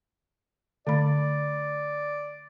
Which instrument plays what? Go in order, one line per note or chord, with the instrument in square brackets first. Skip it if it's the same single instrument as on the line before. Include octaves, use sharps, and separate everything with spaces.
[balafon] D3 A3 B5 [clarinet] D5